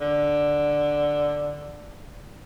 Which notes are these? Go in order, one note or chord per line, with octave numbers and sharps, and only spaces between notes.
D3